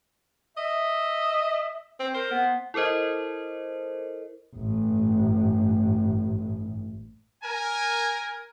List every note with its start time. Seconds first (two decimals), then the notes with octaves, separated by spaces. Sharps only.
0.57 D#5 E5
2.00 C4
2.14 A#4 C5
2.31 B3
2.74 E4 A4 A#4 C5 D#5
4.55 A1 G2
7.44 A#4 G#5